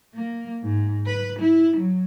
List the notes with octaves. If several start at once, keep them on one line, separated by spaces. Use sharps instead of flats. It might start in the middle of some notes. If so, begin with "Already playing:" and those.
A#3
G#2
B4
E4
F#3